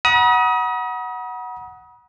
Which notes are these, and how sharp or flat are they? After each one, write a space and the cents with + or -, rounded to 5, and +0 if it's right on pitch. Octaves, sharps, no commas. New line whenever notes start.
F#5 +0 B5 -45 D#6 +25